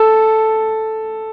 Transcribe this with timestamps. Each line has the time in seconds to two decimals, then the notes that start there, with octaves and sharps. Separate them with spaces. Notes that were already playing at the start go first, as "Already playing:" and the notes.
Already playing: A4